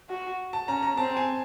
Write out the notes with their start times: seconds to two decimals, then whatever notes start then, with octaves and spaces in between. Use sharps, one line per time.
0.10 F#4
0.53 A5
0.68 C#4 A#5
0.83 A#5
0.97 C4 A5
1.17 G#5